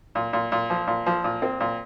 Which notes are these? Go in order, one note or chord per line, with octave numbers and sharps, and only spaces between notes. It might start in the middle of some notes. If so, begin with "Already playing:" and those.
A#2
A#2
A#2
F3
A#2
F3
A#2
C4
A#2